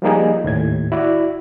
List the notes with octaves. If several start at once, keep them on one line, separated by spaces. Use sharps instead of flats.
F3 G3 A#3 D#4 G#4
D#2 A2 G#6
E4 F#4 D5